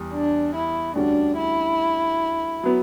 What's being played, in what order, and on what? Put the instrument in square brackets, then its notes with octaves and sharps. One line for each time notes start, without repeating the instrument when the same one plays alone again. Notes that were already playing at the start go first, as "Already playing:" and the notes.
Already playing: [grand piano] E2 G3
[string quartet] D4
E4
[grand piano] D2 D3 G3 C#4 F#4 [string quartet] D4
[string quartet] E4
[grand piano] F#3 B3